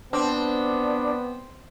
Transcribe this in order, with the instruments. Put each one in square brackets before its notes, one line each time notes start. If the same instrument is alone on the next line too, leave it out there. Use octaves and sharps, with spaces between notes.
[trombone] B3 [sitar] C4 [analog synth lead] D4